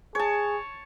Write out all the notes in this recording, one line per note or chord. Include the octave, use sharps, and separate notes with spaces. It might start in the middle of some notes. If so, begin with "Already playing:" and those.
G#4 C#5 A5